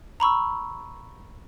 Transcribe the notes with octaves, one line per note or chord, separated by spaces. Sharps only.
A#5 B5 C#6 E6